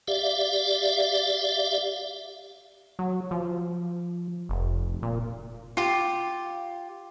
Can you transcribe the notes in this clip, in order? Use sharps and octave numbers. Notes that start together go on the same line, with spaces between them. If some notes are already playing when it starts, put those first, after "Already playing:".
G4 D5 E5 F5
F#3
F3
F1
A#2
F4 G4